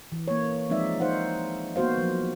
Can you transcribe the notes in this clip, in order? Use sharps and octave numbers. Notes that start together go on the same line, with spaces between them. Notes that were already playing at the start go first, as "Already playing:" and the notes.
E3
A#3 C#5
F3 G#3 C4 D#4 D5 E5
D#4 C5 F5 F#5
A#3 B3 F#4 C5 F5
F3 F#3